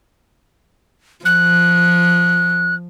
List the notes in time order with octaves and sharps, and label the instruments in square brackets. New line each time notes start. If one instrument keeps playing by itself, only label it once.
[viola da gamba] F3 [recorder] F#6